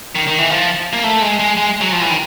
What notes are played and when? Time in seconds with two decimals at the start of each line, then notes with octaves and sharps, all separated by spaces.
0.15 D#3
0.28 D#3
0.38 E3
0.50 F3
0.93 A#3
1.04 A3
1.22 G#3
1.39 G#3
1.57 G#3
1.81 F#3
1.92 F3
2.02 E3
2.10 D#3